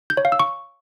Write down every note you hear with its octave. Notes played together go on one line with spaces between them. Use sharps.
G6
C#5
F5
E6
C#6